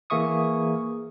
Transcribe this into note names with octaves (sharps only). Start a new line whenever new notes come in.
E3 A#3 G#4 E5 C#6 D#6